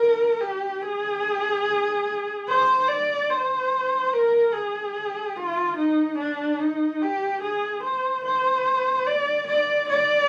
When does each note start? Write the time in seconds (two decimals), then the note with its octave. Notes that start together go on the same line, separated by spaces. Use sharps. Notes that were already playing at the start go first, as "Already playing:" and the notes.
Already playing: A#4
0.41 G4
0.82 G#4
2.48 C5
2.88 D5
3.29 C5
4.13 A#4
4.53 G#4
5.36 F4
5.77 D#4
6.19 D4
6.60 D#4
7.01 G4
7.42 G#4
7.84 C5
8.25 C5
9.07 D5
9.48 D5
9.90 D5